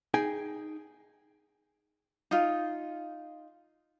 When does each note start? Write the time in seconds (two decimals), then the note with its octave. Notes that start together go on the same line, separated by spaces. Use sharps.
0.14 D#4 G#4 G5 G#5
2.31 D#4 F4